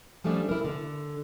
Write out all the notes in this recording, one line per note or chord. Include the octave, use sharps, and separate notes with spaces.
F3 G3 A3 C#4 D4
E4 A#4
D3